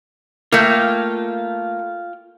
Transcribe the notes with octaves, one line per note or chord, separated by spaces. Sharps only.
A3 A#3 F4 G5